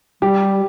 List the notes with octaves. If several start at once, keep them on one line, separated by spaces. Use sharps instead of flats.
G3 G4